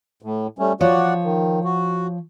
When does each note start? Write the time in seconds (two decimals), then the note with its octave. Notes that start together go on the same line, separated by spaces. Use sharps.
0.22 A2
0.59 G3 A3 C#4
0.81 F3 F#4 C#5 D5 F#5
1.23 D#3
1.64 F#4